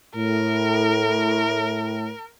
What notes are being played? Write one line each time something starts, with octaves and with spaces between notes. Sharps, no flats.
A2 A#4